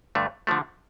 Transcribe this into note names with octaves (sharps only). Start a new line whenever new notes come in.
G2 D3 A3
D3 F3 A3